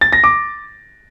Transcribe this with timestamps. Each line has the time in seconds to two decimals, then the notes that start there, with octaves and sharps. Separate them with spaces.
0.01 A6
0.13 A#6
0.24 D6